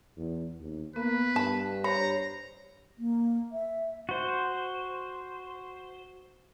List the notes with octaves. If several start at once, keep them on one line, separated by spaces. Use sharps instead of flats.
E2
D#2
A#3 B3 B4
G2 A5
G4 C5 C#5 A#5 B5
A#3
E5
F#4 C5